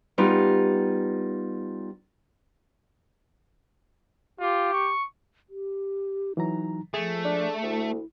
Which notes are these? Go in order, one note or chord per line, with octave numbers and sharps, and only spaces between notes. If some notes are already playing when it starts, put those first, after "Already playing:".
G3 B3 D#4 F4 G4
F4 G4
C#6
G4
E3 F#3 D#4 A#5
F3 A3 G#4
D4
D2 E4